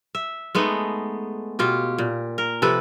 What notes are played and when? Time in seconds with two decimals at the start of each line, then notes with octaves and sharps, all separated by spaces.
0.15 E5
0.55 G#3 A3 B3 D#4
1.59 B2 F4 G4
1.98 A#2
2.38 A#4
2.62 C3 F3 A4 B4